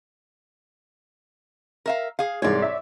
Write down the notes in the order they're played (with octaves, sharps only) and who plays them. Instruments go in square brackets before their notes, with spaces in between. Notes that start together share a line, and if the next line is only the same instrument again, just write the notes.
[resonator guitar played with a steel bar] A#4 E5 F5
G#4 F5
[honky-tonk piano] C2 G#2 G#3 [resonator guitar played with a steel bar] C#5 D5
[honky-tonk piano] E5